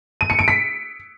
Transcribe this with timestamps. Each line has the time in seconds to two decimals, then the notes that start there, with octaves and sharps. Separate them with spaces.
0.21 D#7
0.30 C#7
0.39 D7
0.48 B6